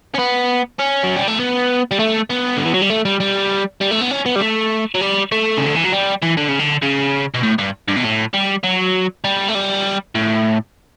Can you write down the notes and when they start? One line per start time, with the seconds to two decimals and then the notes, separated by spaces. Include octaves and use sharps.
0.14 C#4
0.19 B3
0.79 C#4
1.03 F#3
1.16 G3
1.28 A3
1.39 B3
1.91 G3
1.99 A3
2.30 B3
2.57 D3
2.65 E3
2.74 F#3
2.82 G3
2.90 A3
3.05 G3
3.20 G3
3.81 G3
3.91 A3
4.01 B3
4.11 C#4
4.26 B3
4.36 G3
4.41 A3
4.95 F#3
5.01 G3
5.32 A3
5.57 C#3
5.66 D3
5.75 E3
5.84 F#3
5.92 G3
6.22 E3
6.37 D3
6.48 C#3
6.59 D3
6.83 C#3
7.34 B2
7.43 A2
7.58 G2
7.88 G2
7.96 B2
8.03 A2
8.34 G3
8.63 F#3
9.24 G3
9.48 A3
9.55 G3
10.15 A2